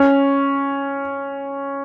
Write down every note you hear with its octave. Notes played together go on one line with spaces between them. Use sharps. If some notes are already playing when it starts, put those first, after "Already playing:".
Already playing: C#4